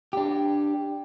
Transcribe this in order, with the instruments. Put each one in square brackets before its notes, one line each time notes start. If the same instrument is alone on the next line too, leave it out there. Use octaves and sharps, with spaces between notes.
[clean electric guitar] D4 G4